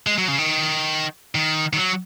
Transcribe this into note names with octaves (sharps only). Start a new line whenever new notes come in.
G#3
F#3
C#3
D#3
D#3
D#3
F#3